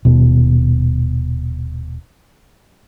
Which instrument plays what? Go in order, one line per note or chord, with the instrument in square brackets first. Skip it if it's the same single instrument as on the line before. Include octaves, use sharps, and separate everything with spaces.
[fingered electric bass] D#1 B2